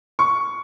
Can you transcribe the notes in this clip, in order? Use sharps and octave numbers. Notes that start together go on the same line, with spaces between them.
C#6